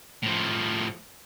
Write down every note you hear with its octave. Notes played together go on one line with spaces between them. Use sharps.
A2 F3